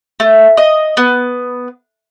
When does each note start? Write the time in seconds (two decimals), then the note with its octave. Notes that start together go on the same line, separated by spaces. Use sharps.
0.20 A3
0.57 D#5
0.97 B3